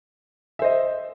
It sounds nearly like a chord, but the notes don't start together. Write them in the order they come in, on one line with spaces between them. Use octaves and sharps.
E5 C5 D#5